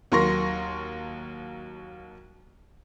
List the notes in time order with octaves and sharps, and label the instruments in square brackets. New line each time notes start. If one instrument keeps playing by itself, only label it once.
[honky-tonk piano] D#2 F#3 A#4 C6 C#6 A#6